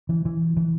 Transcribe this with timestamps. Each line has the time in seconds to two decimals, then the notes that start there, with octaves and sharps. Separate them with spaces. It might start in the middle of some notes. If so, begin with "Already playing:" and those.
0.09 E3
0.25 E3
0.57 E3